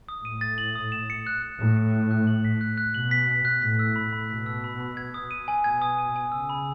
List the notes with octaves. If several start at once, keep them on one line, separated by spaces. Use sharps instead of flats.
D#6
A2 D#7
A6
F#7
D#6
E7
C#7
F#6
F#6
A2 E7
C#7
F#6
F#6
F#7
B6
F#6
F#6
B2 F#7
B6
F#6
F#6
A2 B6
E6
B5
B5
B2 B6
E6
B5
B5
G#6
D#6
D#7
G#5
B2 G#6
D#6
D#7
G#5
C#3 E6
B5